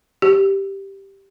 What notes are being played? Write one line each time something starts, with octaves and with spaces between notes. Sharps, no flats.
G4